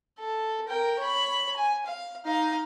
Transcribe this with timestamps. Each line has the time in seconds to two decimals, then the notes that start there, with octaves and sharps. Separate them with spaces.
0.19 A4
0.68 A#4 G5
0.99 C#5 B5
1.56 G#5
1.86 F5
2.25 D#4 F5